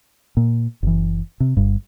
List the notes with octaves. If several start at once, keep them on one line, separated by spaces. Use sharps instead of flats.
A#2
F#1 E3
C3
G1 G2